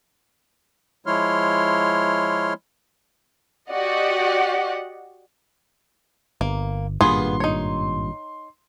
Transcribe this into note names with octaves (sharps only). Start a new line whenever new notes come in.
F3 G#3 E4 C#5 C6 F6
F#4 G4 D5 D#5 F#5
G1 A#3
G#1 G2 A#2 B3 F4 G#4 C6
D#4 C#5